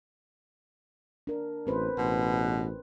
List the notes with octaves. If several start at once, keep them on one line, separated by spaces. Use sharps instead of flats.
D4 A#4
A1 C4 B4 C5
A1 B2